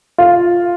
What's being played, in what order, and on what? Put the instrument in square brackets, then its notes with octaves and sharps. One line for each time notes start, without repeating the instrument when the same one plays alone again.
[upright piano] F4